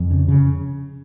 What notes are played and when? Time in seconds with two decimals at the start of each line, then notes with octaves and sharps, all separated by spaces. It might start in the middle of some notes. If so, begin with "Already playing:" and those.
Already playing: F2
0.11 C#3
0.28 C#3